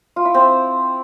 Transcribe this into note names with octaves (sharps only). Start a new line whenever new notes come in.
F4
E4
C4